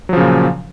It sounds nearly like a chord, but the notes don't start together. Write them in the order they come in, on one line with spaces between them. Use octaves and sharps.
F#3 F3 C#3 A#2